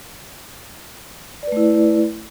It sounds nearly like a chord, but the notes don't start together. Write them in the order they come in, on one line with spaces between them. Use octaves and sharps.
D5 B4 A3 E4